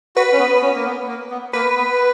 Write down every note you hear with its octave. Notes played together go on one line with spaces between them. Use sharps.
F#4 B4
C#4
B3
B3
C#4
A#3
B3
A#3
B3
A#3 B4
B3